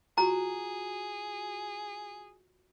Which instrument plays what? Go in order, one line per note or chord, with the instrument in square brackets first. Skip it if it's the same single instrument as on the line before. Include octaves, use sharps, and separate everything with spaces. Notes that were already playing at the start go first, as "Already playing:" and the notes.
[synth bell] F4 F#4 [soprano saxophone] G#4 [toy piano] A#5